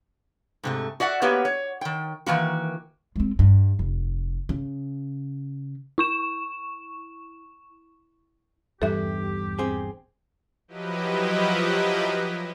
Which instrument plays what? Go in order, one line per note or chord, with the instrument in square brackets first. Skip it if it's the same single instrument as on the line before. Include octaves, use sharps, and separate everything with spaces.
[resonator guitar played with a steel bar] G#2 C3 A3
F#4 D5 E5 F#5
A#3 B3 F#4 G4 B4 C#5
C#5
D#3 G5
D#3 E3 A#3 F#4
[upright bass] G#3 C4
G2
F1
C#3
[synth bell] E4 C#6 E7
[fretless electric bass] D#1 E2 G2 [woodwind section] G4 [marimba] A4 E5
[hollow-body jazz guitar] C4 G#4
[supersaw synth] F3 F#3 E4 G4 B4 D#5